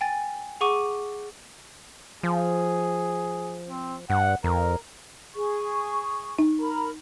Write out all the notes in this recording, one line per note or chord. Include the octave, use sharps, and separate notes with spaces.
G5 G#5 A6
G#4 F#5 C#6 D6 D#7
F3 G#4
C4
G2 F#5
F2 A#4
G#4 C#6
D#4
A#4 A#5 B5